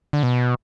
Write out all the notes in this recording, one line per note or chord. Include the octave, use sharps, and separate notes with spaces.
D3
B2